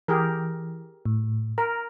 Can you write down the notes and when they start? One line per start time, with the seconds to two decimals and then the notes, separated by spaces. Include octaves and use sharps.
0.08 E3 G4 G#4 A#4
1.05 A2
1.58 A#4 A#5